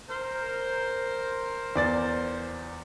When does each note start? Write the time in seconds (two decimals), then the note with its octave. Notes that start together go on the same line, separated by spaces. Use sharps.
0.09 A#4 C5
1.76 E2 D5 A6